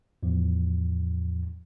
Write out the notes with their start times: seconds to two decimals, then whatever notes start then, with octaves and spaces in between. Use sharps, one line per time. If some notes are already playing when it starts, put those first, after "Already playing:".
0.23 E2 A2 F3